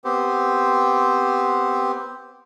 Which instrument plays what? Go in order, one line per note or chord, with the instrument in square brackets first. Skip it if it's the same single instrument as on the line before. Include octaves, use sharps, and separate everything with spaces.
[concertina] B3 C4 G4 C5